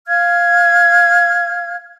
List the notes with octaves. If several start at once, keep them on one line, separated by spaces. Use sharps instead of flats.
F5 F6 G#6